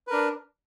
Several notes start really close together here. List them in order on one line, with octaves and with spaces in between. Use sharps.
B4 A#4 D4